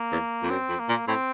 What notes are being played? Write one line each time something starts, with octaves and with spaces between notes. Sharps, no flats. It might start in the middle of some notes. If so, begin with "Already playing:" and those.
Already playing: A#3
E2
F2
F#2 C4
F2
A#3
A#2
A2 C4